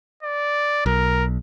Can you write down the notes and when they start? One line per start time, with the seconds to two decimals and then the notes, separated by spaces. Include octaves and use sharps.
0.23 D5
0.86 B1 A#4